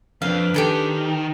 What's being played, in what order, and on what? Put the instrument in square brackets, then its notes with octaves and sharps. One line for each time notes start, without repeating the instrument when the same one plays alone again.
[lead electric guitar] F2 [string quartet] D4 B4 [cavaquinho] F5
[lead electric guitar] D#3 [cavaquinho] G4 A4 G#5
[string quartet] D#4